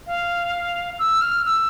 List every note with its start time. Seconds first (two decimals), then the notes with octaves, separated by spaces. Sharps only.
0.07 F5
0.99 E6
1.21 F6
1.45 E6